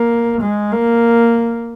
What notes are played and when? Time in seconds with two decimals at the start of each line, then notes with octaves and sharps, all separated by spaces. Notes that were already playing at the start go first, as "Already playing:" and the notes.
Already playing: A#3
0.41 G#3
0.72 A#3